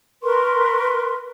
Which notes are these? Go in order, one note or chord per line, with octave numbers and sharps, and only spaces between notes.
A#4 B4 C6 C#6